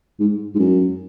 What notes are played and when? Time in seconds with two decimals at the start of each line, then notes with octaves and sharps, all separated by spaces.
0.20 G#2
0.55 G#2
0.59 F#2